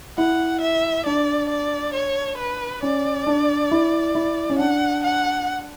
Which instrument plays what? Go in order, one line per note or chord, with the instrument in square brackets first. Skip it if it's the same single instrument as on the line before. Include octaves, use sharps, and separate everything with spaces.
[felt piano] E4 [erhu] F#5
[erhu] E5
[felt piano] D4 [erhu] D5
[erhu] D5
C#5
B4
[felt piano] C#4 [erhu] D5
[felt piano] D4
E4
E4
C#4
[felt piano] D4 [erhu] F#5
[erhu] F#5